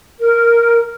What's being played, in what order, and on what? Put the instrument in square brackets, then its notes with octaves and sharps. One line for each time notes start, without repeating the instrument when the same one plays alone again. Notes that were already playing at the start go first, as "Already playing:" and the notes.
[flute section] A#4